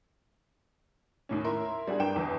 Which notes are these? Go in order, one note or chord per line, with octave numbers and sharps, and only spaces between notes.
D#2 A2 C#4
E4 A#4 C6
G3 D4 F#4 G#4
G2 A#4 G5 E7
G1 E2